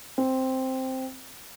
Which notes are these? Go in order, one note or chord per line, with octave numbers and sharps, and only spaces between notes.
C4